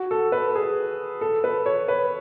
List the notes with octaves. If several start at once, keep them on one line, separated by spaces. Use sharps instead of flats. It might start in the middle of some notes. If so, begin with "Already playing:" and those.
Already playing: F#4
A4
B4
G#4
A4
B4
C#5
B4